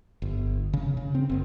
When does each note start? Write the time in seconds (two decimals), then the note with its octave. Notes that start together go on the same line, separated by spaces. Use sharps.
0.22 G1
0.73 C#3
0.97 C#3
1.15 C4
1.29 F#1